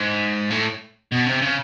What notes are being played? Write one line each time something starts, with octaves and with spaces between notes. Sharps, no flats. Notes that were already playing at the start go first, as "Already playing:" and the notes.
Already playing: G#2
A2
B2
C3
C#3